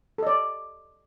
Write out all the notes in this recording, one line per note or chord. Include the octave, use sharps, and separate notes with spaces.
A4 D5 D#5